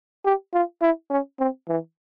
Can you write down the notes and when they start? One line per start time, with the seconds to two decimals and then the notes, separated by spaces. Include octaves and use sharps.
0.25 G4
0.54 F4
0.81 E4
1.10 C#4
1.39 C4
1.68 E3